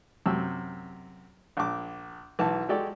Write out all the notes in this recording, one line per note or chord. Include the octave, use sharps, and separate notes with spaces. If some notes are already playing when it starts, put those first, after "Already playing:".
F#2 C3 E6
A#1 D6
B1 E3 A5
G#3 F#4 G4 A4 D5